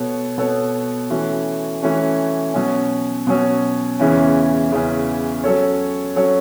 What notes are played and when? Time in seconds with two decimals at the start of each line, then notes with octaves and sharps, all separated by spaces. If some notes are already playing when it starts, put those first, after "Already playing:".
Already playing: B2 B3 A4 C#5
0.38 B2 B3 A4 C#5
1.10 E3 A3 C#4 F#4
1.82 E3 A3 C#4 F#4
2.54 B2 F#3 C#4
3.27 B2 F#3 C#4
3.99 E2 C#3 E3 C#4
4.72 E2 C#3 E3 C#4
5.44 F#3 C#4 A4 C#5
6.16 F#3 C#4 A4 C#5